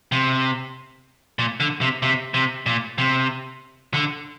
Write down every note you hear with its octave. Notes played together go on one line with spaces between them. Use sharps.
C3
A#2
D3
C3
C3
C3
A#2
C3
D3